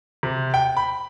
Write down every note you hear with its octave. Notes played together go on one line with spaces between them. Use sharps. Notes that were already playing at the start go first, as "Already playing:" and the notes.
C3
G5
B5